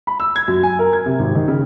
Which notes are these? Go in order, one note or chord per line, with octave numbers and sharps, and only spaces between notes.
B5
E6
G#6
F#2
G#5
A#4
G#6
C3
G#1
D#3
C#3